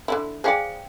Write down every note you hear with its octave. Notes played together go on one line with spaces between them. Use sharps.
D3 D4 E4
G#4 A4 C5 D5 F5 G5